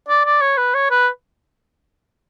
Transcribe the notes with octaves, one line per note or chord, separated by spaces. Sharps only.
D5
D5
C#5
B4
C#5
B4